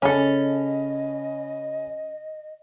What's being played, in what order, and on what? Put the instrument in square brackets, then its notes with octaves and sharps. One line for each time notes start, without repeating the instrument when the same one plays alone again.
[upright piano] C#3 G#5 B5 [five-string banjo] C#4 A4 [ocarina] D#5